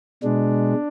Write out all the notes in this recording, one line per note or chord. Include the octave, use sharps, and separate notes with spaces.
B2 G#3 D4